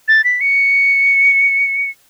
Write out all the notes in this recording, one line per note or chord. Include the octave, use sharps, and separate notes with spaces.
A6
B6
C#7